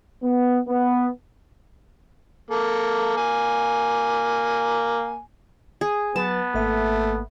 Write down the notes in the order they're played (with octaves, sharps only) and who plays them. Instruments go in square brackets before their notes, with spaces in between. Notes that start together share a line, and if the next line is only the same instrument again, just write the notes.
[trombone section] B3
B3
[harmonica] A#3 A4
A#3 G#5
[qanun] G#4
[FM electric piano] F#3 B4 [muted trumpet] B3 [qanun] A5
[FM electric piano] G#1 A#3 E5 [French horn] A3